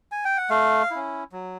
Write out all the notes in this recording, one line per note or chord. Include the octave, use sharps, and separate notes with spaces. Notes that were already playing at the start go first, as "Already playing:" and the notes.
G#5
G5
F#5
A3 F5
C#4 E4
F#3